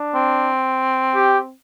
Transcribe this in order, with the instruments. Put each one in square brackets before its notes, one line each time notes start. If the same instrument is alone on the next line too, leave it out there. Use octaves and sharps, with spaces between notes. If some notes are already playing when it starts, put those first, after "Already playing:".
Already playing: [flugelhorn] D4
[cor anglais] C4
[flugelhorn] G4